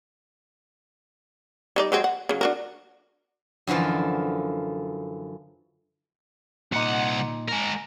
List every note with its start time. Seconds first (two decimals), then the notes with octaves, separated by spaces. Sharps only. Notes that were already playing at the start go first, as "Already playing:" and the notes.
1.76 G3 D#4 D5
1.92 F#3 G#3 C4
2.04 F#5
2.29 C#3 F#3
2.41 D4 F#4 A#4
3.67 F#2 D3 E3 F3 F4
6.72 C2 A#2 D#4 F#5
7.48 G#3 A#4